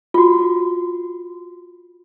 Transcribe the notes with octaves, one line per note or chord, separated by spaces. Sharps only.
F4 F#4